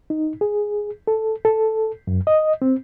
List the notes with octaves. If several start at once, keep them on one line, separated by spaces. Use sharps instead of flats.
D#4
G#4
A4
A4
F#2
D#5
C4